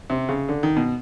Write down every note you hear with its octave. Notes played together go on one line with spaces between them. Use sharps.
C3
C#3
D3
D#3
B2